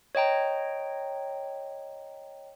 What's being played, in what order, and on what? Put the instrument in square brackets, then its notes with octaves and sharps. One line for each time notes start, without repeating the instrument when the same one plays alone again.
[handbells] C#5 D#5 G5 A#5